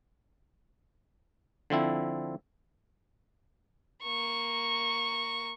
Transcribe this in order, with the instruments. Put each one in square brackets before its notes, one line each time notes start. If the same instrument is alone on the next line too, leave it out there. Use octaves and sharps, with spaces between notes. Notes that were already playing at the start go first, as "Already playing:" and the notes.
[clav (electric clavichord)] D3 F3 C4 E4
[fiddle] A#3 C#6